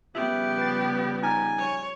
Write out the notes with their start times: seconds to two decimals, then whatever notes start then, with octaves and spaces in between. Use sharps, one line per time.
0.15 C#3 F3 G3 B3 G4 E5
0.58 B4 A6
1.23 D#4 G#5 F6 A6
1.58 C#5